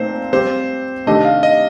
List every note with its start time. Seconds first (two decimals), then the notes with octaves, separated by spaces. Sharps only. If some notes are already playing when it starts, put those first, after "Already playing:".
Already playing: A#2 A3 C4 D#4 C5
0.33 G3 C4 G4 C5
1.06 C3 D#3 A3 D4 G4 D#5
1.25 F5
1.43 D#5